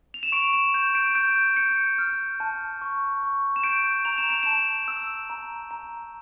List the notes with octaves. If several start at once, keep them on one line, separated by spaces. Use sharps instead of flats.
F7
E7
C#6 D7
E7
G6 E7
D7
G6 D7
G6 C#7
F6
A5
C#6
C#6
E7
G6 D7
A#5 F7
E7
D7
A5 E7
E6
A#5
A#5